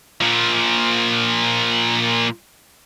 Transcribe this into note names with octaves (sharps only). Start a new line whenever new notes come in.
A#2 F3